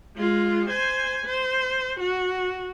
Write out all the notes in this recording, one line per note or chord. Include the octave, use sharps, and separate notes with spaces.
G#3 F4
C5 G#5
C5
F#4